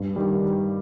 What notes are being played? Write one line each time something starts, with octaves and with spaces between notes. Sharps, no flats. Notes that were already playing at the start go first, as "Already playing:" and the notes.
Already playing: G2
D#3 G3